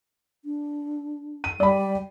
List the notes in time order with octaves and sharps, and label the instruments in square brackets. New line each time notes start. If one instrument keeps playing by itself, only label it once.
[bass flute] D4
[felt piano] D#7
[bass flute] G3 [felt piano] D5 B5